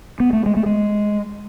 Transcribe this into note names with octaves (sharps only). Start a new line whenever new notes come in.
B3
A3
G#3
A3
G#3